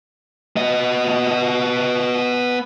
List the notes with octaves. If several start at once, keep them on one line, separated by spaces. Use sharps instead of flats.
B3 D#5